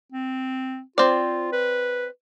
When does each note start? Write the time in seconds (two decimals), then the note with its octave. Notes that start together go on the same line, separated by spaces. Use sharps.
0.12 C4
0.98 C4 F4 D5
1.53 B4